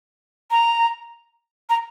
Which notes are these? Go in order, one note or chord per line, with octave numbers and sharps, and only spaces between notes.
A#5
A#5